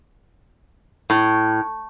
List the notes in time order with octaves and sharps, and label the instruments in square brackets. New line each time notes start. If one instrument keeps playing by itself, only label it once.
[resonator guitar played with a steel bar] A2